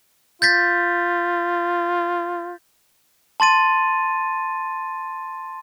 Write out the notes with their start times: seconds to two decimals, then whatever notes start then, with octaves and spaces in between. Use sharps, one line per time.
0.42 F4 G6 A6 B6
3.40 A5 C6 A6 D#7